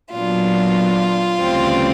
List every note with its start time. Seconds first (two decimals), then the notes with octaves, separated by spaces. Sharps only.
0.14 A#2 F#3 B3 D4 F4
1.41 D2 C#3 E3 G3 C4